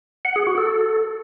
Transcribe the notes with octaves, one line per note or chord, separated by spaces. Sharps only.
F#5
G#4
F#4
A4